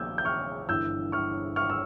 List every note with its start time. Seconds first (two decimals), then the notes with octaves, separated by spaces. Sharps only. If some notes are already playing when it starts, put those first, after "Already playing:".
Already playing: A#1 A#2 E6 G6 G#6
0.18 G6
0.25 C#6 F6
0.69 G1 G2 E3 E6 G6
1.12 C#6 F6
1.56 C#6 F6
1.70 E6